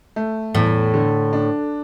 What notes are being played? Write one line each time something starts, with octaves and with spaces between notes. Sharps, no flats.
A3
E2 A2
D3
D4